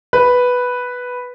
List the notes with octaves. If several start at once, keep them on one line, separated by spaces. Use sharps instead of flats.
B4